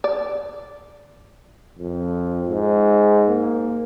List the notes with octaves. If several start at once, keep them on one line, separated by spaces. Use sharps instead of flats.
D5
F2
G#2
A#3